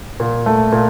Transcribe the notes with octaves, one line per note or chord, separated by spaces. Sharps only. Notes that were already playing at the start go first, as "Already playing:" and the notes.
A#2
A3
A#2